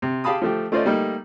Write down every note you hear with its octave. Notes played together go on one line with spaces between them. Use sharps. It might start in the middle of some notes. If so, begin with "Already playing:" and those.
C3
G4 G#4 F5 A5 B5 D#6
F3 A3 G4
A3 C#4 F4 C5 D5 D#5
G3 A3 A#3 D#4